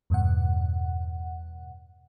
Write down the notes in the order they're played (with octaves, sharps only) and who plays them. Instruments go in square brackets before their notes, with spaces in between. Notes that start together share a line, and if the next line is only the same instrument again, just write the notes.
[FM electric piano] E2 G2 B2 F#5